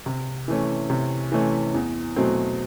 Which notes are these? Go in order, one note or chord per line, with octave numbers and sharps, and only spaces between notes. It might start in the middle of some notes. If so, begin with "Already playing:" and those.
C3
E3 A3 C#4
C3
E3 A3 C#4
E2
B2 F#3 A3 C4